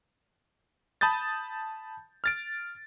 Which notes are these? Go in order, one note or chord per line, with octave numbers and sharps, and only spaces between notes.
A5 B5 D#6 G6 A6
F6 A6 D7